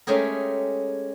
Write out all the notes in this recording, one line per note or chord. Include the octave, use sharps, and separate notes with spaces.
G#3 A3 C#4 G4 G#4 A#4